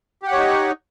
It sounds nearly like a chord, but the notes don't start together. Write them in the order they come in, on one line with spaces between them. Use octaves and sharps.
G4 F#5 C#5 D#4